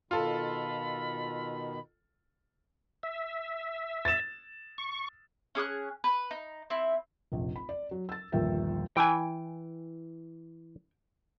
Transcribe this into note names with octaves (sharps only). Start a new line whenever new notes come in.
B2 D#3 F4 A4 B5
E5
A6 E7
C#6
C#4 G#4 D6 F#6
B4
D#4
C4 E4
F1 A#1
B5
D5
F#3
E6 A6
G1 D#2 A#2 F3 E5 G5
E3 G5 G#5